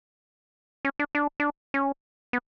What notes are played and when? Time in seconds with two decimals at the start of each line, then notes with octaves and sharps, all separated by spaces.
0.85 C#4
0.99 D4
1.15 D4
1.40 D4
1.74 C#4
2.33 B3